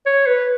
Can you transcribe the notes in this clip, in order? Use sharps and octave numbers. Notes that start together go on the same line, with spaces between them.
C#5
B4